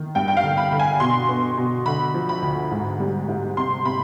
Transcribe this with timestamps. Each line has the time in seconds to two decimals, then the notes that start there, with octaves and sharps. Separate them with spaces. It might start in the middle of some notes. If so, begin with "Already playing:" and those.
Already playing: D#3
0.15 G2 G5
0.28 G5
0.37 F5
0.44 D3
0.57 B5
0.72 D3
0.79 G#5
1.00 B2 C6
1.29 B3
1.57 B2
1.86 D3 B5
2.14 F3
2.29 B5
2.42 D2
2.71 G#2
3.00 G3
3.28 G#2
3.57 C3 C6
3.85 C3 B5